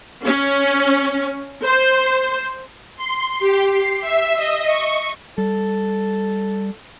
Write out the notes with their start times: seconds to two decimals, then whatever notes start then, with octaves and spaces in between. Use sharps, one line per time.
0.25 C#4
1.63 C5
2.96 C6
3.39 G4
3.71 C7
4.01 E5
4.35 D#5
4.66 C#6
5.38 G3 A4